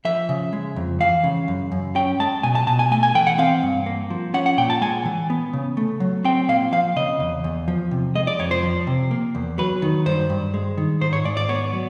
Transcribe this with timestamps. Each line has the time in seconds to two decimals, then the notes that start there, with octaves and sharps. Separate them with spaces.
0.05 F3 E5
0.29 C#3
0.53 G#3
0.76 F2
1.00 E3 F5
1.24 C#3
1.48 F#2
1.72 F#2
1.95 C#4 G5
2.20 G#3 A5
2.43 B2 G#5
2.55 A5
2.67 B2 A5
2.79 G#5
2.91 A3 G#5
3.03 G#5
3.15 E3 G5
3.27 F#5
3.38 C4 F5
3.63 G2
3.86 A#3
4.10 F3
4.34 C#4 F#5
4.46 F#5
4.58 A#2 G5
4.70 A5
4.82 G#3 G#5
5.05 E3
5.30 B3
5.53 C#3
5.77 A3
6.00 F#3
6.24 C4 G5
6.48 A#2 F5
6.72 F3 F5
6.96 C#3 D#5
7.20 E2
7.44 E2
7.68 F3
7.91 C3
8.15 G#3 D#5
8.27 D5
8.39 F2 C#5
8.51 C5
8.63 F3
8.87 C3
9.11 A#3
9.35 E2
9.58 F#3 B4
9.82 D#3
10.06 G2 C5
10.30 G2
10.54 G#3
10.78 D#3
11.01 G#2 C5
11.13 C#5
11.25 G#2 D5
11.37 D5
11.49 B3 C#5
11.73 F#3